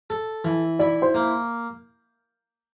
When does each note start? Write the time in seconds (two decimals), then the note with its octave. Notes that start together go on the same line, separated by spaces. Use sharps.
0.10 A4
0.44 E3
0.79 E4 D5
1.02 C5
1.14 A#3